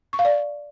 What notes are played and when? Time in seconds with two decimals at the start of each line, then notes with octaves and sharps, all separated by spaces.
0.13 C#6
0.19 F5
0.25 D5